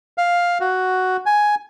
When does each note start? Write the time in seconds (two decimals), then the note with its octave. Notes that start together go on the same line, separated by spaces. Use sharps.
0.18 F5
0.61 F#4
1.26 G#5